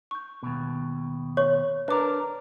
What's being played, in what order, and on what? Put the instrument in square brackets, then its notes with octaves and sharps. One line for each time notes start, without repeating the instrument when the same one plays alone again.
[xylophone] C#6 G6
[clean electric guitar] D#2 B2
[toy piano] C#5 [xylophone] C#6
[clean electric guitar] D4 A#4 [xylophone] B4 D6